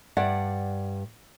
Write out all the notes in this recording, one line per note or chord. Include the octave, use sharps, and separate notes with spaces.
G2 D5 F#5